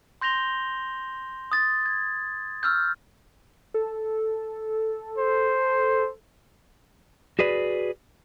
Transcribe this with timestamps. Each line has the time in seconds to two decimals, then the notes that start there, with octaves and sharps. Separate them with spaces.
0.21 C6 G6 A#6 F7 G7
1.52 D#6 A6
1.86 G#6
2.63 C#6 E6 F6 G6
3.74 A4
5.18 C5
7.39 F#4 G#4 B4 D5